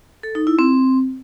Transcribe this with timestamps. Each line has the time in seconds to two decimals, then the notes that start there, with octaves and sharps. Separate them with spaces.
0.23 A4
0.35 D#4
0.47 E4
0.59 C4